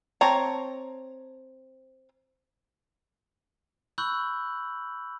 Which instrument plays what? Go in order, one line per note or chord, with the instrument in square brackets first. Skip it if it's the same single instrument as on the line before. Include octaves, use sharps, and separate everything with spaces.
[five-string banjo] C4 C#5 A5 A#5
[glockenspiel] B5 C#6 E6 F#6 G6 F#7